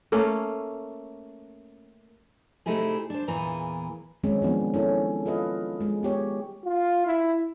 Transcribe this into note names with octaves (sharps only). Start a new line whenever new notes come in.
A3 A#3 C#4
C3 A3 D#4 E4 G4 G#4
D4 C5
E2 A#2 E3 G#4 A#5
D#3 F#3 G#3 C4 C#4
F3 F#3 B3 D4
C#4 E4 A4
F4 A4 B4 D#5 F5
G#3 G#4
B3 G4 C#5
F4
E4